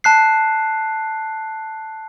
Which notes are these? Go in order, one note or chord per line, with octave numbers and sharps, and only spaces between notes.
A5 F#6 C7